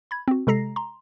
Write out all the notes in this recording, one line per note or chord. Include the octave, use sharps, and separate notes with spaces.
B5 G#6
C4 F#4
C3 G#3 A4 A#5 A#6 C7
A#5 C6